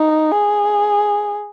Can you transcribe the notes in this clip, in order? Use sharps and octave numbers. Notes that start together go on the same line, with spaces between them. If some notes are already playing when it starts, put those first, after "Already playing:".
Already playing: D#4
G#4